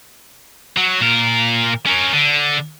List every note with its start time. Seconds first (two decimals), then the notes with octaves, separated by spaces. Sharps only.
0.77 F#3
1.01 A#2 A#4
1.86 C#4 A#4
2.13 D3